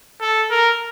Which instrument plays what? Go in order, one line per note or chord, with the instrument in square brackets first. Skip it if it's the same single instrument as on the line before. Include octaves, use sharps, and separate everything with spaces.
[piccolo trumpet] A4
A#4